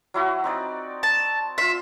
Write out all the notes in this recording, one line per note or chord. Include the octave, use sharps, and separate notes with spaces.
F#3 E4 F#4
C4 D#4 D5
A5
F4 E5 C6